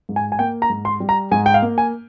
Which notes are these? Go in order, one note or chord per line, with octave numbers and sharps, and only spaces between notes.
G#2
G#5
G#5
A#3 G5
A#5
G#2
C6
G3
A#5
G#2 G#5
G5
F5
A#3
G#5